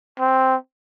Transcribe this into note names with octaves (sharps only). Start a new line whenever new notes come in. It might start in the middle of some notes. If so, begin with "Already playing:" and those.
C4